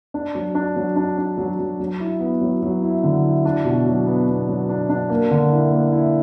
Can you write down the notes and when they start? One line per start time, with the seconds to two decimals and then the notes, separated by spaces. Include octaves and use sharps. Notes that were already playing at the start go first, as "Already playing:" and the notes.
0.14 D4
0.35 F#3
0.55 D4
0.76 F#3
0.96 D4
1.18 D4
1.38 F#3
1.59 F#3
1.80 F#3
2.00 E4
2.20 B3
2.41 F#3
2.63 F#3
2.82 E4
3.03 D3
3.23 E4
3.45 D4
3.65 B2
3.85 F#3
4.06 B3
4.28 B3
4.48 F#3
4.69 D4
4.89 D4
5.09 A#3
5.31 D3
5.51 E4
5.71 A#3
5.92 E4